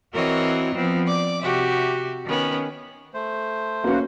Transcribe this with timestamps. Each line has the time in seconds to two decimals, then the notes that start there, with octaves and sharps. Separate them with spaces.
0.14 E3 C4 F#4 A#4 C#5 D#5
0.75 F3 B3 C4
1.06 D5 D6
1.42 C3 F#4 G4 E5
2.26 D#3 B3 C#4
3.14 A3 C5
3.84 A#3 C#4 F#4 B4 F5